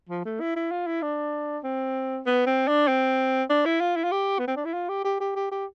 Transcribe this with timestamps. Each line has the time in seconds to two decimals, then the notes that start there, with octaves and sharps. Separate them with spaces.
0.09 F3
0.25 A3
0.40 E4
0.56 E4
0.71 F4
0.87 E4
1.02 D4
1.64 C4
2.26 B3
2.47 C4
2.68 D4
2.88 C4
3.50 D4
3.65 E4
3.80 F4
3.96 E4
4.04 F4
4.12 G4
4.39 B3
4.48 C4
4.56 D4
4.65 E4
4.74 F4
4.89 G4
5.04 G4
5.20 G4
5.36 G4
5.51 G4